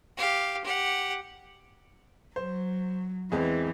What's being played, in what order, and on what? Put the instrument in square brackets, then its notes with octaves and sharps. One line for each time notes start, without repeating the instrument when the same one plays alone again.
[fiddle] G4 F5
G4 F#5
[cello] F#3 [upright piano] C5
[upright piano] E2 G#3 C4 [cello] E3